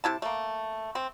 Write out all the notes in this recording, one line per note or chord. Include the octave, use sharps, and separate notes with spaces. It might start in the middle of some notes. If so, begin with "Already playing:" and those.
C3 E4 A5
A3 A#3
C4